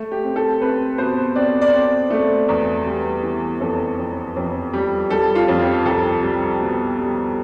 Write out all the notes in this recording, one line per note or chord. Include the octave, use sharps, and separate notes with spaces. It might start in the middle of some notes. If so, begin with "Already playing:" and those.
Already playing: A3
G4
C4
A4
C4 B4
B2 C5
C4 D5
D5
C4
A3
E2
G3
E3
F2 A4
F2
F2
G3
G3 A4
F4
F2
G4
C2 A4
G3
B2
G3